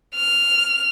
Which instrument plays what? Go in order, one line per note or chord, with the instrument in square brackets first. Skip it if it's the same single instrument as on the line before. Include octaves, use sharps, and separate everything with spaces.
[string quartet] F6